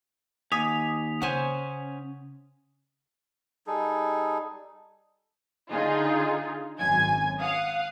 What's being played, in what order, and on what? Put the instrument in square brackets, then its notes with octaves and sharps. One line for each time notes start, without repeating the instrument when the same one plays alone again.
[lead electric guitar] D#2 [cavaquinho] G#5 D6 [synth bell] D#6 B6 F7
[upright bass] C#3 [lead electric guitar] C#4 G#5 [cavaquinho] C5 F#5
[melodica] G3 D#4 G#4 A4
[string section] D3 D#4 F4 G#4
G#1 F#2 G#5 G#6
F5 F#5 D#6